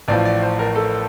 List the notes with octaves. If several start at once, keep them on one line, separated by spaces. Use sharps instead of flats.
A1 A2 F3 D5
D5
C5
A#4
A4